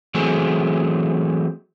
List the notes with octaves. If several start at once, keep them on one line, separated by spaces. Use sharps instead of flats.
E3 F#3 A3 C4 G#4